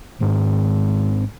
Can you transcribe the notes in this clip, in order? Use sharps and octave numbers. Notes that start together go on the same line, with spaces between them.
G#1 G#2 D4